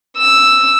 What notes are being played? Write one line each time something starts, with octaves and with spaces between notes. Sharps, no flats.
E6